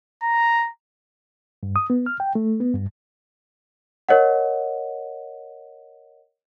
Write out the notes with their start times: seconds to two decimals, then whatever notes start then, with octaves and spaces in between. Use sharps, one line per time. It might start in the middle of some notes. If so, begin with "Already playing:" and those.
0.23 A#5
1.63 G2
1.76 D#6
1.90 B3
2.06 F6
2.20 G5
2.35 A3
2.60 B3
2.74 G2
4.09 A#4 C#5 D#5 F#5